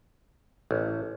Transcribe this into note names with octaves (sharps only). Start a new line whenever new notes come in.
A1